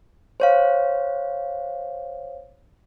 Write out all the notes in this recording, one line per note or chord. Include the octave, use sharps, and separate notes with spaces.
C5 C#5 F5